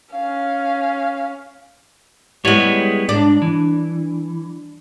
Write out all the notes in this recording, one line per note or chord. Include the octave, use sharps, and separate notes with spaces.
C#4 F5
G3 G#3 B3 E4 C#5
G#2 D4
E3